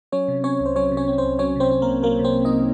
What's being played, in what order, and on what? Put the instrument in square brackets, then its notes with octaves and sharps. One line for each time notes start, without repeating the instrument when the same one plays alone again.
[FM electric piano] F#3 C#4 C#5
C3
C4 C#4 C#5
C2
C5
F#3 C#4 C#5
C3
C#4 C#5
C4
C4 C5
C2
F#3 C#4 C#5
C3 C4 C5
C#4
A#3 A#4
C2
F#3 A#3 A#4
C3
C4 C5
C#4
D#4 D#5